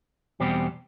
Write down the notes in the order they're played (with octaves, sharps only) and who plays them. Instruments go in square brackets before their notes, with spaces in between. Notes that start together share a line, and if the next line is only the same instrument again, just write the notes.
[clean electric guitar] E2 B2 G3 C4 G4